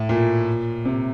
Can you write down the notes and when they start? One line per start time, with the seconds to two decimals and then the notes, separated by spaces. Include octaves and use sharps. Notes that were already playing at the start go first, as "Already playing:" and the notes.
Already playing: A2
0.09 A#2
0.85 C3